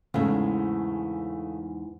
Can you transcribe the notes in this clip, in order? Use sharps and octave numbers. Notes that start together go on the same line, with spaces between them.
E2 G#2 C#3 A3